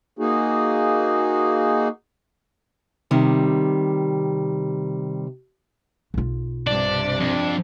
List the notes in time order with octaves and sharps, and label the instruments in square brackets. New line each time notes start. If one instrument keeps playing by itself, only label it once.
[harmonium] A#3 D#4 F#4 G#4
[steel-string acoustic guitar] C3 D#3 G3
[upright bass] B1 F4
[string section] G2 C3 [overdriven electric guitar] D4 [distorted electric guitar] D5
[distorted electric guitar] F2